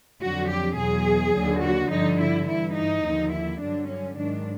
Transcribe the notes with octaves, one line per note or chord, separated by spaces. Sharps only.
F2 D3 F#3 F#4
G4
E2 B2 F#3 G#4
D#2 D3 F#3
F#4
G2 D3 F3 D#4
E4
G2 E3 E4
D#4
D#2 D3 F3
E4
G2 D3 F#3 D4
C#4
G#2 D#3 F#3 D4